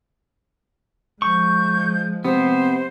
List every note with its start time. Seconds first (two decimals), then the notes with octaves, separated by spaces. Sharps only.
1.22 F3 G#3 C#6 G6
2.25 C3 B3 C5